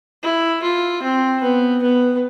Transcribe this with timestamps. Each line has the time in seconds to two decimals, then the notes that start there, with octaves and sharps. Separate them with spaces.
0.23 E4
0.63 F4
1.02 C4
1.42 B3
1.82 B3